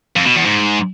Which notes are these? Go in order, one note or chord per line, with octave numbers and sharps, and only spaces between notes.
F2
B2
E2
G#2